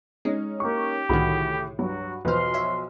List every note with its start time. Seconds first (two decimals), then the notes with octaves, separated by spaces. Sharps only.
0.25 G#3 C#4 D#4
0.60 A#3 G4 C#6
1.09 C2 A2 D3 D#3 F#4 G#4 B5
1.79 G2 F#3 F#4
2.25 B1 E2 F3 B4 C5 C6 F6
2.54 C#5 E5